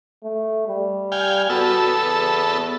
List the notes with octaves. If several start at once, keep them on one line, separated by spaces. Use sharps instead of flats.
A3
G3
F5 G5 G#5
B3 F#4 A4 E6
E2